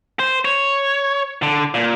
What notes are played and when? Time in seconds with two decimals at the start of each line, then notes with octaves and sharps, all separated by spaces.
0.19 C5
0.45 C#5
1.43 D3
1.74 A#2